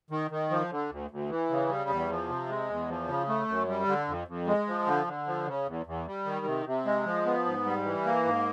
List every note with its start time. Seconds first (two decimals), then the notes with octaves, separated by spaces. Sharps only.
0.10 D#3
0.31 D#3
0.51 F3
0.70 D3
0.90 D2
1.11 D2
1.29 E3
1.50 C#3
1.69 G3
1.90 E2
2.10 F3
2.29 C3
2.49 G#3
2.69 E2
2.88 F3
3.08 C#3
3.28 A3
3.48 F#2
3.68 G3
3.87 D3
4.08 F2
4.28 F2
4.47 G#3
4.67 F3
4.87 D3
5.07 D3
5.27 F3
5.47 C#3
5.67 E2
5.86 E2
6.07 G3
6.26 D#3
6.46 C3
6.66 C3
6.86 G#3
7.05 F3
7.26 B3
7.45 G#2
7.66 G3
7.84 E3
8.05 A#3
8.24 G#2